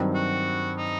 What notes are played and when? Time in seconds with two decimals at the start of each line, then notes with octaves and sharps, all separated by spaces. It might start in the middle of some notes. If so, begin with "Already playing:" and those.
Already playing: G2 D#3 F#3 C4
0.15 F#4
0.77 D#4